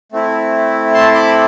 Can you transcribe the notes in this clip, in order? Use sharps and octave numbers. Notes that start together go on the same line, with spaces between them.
A3 C4 E4
A5 C6
C6
B5 D6